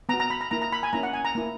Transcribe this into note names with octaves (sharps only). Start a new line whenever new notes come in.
B3 F#4 A#5
A#5
B5
A#5
A#3 E4 A#5
A#5
B5
G#5
A#3 C#4 E4 A#5
F#5
G#5
A#5
A#3 E4